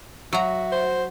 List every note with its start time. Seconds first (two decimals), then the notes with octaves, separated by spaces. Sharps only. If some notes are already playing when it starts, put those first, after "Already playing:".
0.33 F#3 F#4 E5 A#5
0.72 C5